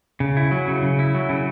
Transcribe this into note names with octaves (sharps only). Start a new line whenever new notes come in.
C#3
E4
F#3
C#3
C#3
E4
F#3
C#3